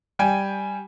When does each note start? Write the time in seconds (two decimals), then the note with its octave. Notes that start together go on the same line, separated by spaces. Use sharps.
0.19 G3 G5 G#5